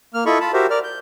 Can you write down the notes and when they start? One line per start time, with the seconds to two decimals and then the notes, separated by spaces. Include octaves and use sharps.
0.14 A#3 F6
0.26 E4 F4 A4 D#5 B5 C#6
0.41 F4 A5 B5
0.53 F#4 G4 A#4 C5 E5
0.70 A#4 D5 F6
0.84 G6